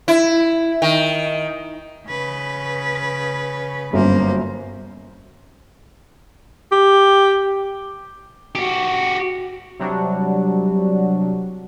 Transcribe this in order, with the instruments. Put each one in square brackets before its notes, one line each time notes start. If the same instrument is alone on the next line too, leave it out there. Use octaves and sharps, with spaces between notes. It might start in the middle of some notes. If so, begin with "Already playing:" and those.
[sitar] E4
D#3
[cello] C#3 B4
[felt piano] G1 F#2 [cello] A#3 C5
[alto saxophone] G4
[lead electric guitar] F#4 G4
[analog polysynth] C3 F#3 G3 D4 F#4